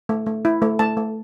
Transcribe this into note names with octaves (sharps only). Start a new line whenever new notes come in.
A3
A3
E4
A3
A3 A5
A3